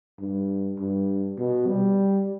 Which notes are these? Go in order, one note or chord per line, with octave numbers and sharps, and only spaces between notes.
G2
G2
B2
G3